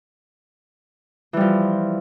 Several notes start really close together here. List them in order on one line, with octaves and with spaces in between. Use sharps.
E3 G3 F3